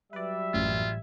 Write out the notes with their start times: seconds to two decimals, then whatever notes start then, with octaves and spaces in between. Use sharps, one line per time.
0.13 F#3 G3 B4 D5 E5
0.54 A1 F#2 E3 F4 G#6